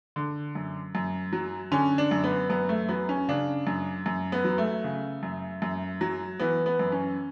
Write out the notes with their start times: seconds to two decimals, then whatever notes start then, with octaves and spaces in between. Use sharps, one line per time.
0.16 D3
0.55 F#2
0.95 F#2
1.33 F#3
1.72 D3 C#4
1.98 D4
2.11 F#2
2.24 B3
2.50 F#2 B3
2.69 A3
2.88 F#3 B3
3.09 C#4
3.29 C#3 D4
3.67 F#2
4.06 F#2
4.32 B3
4.44 F#3
4.58 A3
4.84 C#3
5.23 F#2
5.62 F#2
6.01 F#3
6.39 E3 B3
6.66 B3
6.79 F#2
6.92 C#4